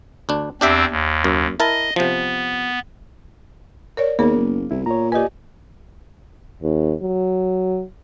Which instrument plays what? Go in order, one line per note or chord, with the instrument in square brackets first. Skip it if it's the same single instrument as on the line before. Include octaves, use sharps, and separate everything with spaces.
[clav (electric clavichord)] D2 D4
[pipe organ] E2 C4 [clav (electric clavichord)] D4 G4 E5
[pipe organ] D#2
[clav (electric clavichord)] F#2
[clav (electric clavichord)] E4 A#4 A5 [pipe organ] D#5
[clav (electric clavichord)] C3 F3 [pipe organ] B3
[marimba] A#4 C#5 D5
[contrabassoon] D#2 [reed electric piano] A#3 [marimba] B3 G#4 A#4
[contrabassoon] F#1
[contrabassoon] C2 [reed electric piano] E4
[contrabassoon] A#2 [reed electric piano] C#5 A#5
[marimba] G4 B4 [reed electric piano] D5 D#5 G#5
[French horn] D#2
F#3